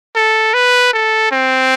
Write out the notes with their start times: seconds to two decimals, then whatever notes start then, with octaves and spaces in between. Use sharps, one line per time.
0.16 A4
0.54 B4
0.93 A4
1.32 C4